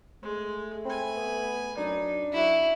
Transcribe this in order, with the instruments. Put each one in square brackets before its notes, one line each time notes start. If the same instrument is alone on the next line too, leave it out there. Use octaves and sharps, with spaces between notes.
[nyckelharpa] G#3 [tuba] A3
[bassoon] C4 [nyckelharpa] G#5 B5
[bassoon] B3
[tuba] F#2 [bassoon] D4 [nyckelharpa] D#4
[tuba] F#2 [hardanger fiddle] E4 [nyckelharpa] F#4